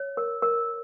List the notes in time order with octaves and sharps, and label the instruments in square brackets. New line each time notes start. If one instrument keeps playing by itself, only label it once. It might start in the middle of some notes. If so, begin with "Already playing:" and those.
Already playing: [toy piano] C#5
A#4
A#4